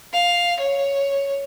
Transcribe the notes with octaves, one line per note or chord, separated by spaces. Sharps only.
F5
C#5